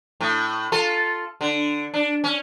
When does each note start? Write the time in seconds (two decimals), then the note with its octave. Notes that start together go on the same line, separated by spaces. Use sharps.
0.21 A2
0.72 F4 A4
1.41 D3
1.94 D4
2.24 C#4